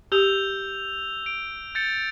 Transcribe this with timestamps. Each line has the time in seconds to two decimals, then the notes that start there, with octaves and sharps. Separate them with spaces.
0.12 G4 E6 G6 F7
1.26 D7
1.75 G6 A6 C#7